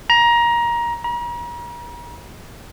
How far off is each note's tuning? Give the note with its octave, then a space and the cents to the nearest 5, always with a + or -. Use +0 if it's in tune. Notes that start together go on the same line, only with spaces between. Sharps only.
A#5 +20
A#5 +40